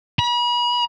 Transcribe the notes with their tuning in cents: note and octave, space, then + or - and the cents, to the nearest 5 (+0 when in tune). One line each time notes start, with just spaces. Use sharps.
B5 -40